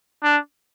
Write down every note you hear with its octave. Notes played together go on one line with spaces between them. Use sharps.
D4